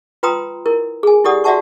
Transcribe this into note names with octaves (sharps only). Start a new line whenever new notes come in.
F4 B4 G5 A#5 C6 D#6
E4 A#4
G#4 G#5
E4 G4 A4 D5 F#5 D#6
F#4 D5 E5 F#5 A5 C#6